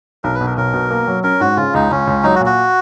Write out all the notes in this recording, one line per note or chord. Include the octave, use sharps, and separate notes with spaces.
B1 A#4
B4
B2
A#4
B1 A#4
B2
A#3
F#3
C#4 A#4
G#2 F#4
C#3 F4
C#2 D#4
C#2 C#4
C#2
F#3 D#4
F#4
A#2
F#4